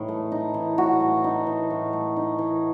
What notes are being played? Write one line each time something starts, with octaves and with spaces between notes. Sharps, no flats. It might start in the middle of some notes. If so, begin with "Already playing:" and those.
Already playing: A2 E3 D#4 E4
A3
D#4
E3
A2 F#4
A3
D#4
E3
A2
A3
D#4
E3